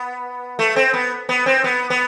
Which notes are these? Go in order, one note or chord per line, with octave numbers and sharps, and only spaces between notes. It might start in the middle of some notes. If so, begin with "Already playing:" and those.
Already playing: B3
A3
C4
B3
B3
C4
B3
B3